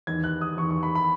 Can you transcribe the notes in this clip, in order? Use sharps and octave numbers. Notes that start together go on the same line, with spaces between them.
E2 D#3 G#6
F#6
D#6
E2 D#3 C#6
C#6
B5
B5